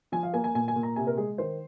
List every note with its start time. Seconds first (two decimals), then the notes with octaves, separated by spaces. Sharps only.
0.12 F3 G#5
0.23 F5
0.33 A#3 G#5
0.44 G#5
0.55 A#2 G#5
0.68 G#5
0.76 A#2
0.83 A#5
0.96 C3 G#5
1.07 A#4
1.17 G#3 G#4
1.38 D#3 C5